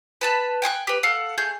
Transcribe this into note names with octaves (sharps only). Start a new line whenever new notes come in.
B4 A5 B5
G5 G#5 C6 F#6
G4 B4
A4 F5 F#5
A3 G#4 G6